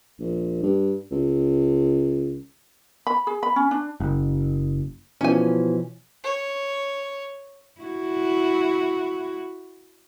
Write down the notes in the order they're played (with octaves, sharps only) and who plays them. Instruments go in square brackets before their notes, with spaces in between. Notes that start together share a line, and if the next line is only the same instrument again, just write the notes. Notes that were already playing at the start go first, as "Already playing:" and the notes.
[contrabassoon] A#1
G2
C#2
[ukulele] B5
G#4
B5
C#4
D4
[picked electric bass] F#1
[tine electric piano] B2 E3 F3 [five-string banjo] C#4 G#5
[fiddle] C#5
[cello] E4 F#4